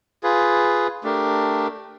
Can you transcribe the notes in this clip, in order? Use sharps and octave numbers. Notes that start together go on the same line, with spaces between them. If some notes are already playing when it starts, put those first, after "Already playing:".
F4 G#4 B4
A3 D4 G4 A#4